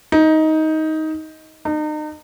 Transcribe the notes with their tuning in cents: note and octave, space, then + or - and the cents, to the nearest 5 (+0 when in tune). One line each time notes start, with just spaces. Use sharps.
D#4 +15
D#4 -35